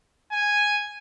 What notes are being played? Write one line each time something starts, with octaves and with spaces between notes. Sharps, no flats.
G#5